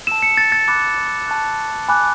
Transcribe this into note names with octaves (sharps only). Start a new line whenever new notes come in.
A5 E6 E7
C#7
A6
A6
B5 D6 F#6 A6
A5 C#6 F#6
G#5 B5 D6 F#6